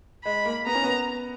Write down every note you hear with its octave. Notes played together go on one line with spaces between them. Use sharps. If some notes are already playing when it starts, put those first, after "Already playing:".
G#3 B5
A#3
B3 A#5
C#4
B3